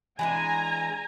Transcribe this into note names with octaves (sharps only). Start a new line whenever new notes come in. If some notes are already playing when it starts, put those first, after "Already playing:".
E3 G#3 D4 G#5 A#5